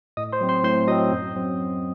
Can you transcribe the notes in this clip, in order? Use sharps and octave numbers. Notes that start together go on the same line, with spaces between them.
A2 D#5 D#6
C5 C6
F#3 C4
C5 C6
A2 C5 C6
F#3 C4 D#5 D#6
F#2
F#3 C4
F#2